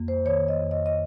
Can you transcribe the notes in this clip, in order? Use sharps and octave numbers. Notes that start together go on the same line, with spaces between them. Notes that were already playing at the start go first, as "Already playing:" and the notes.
Already playing: F2 A#3
C5
D#3 C#5
D#5
F2
D#5
D#5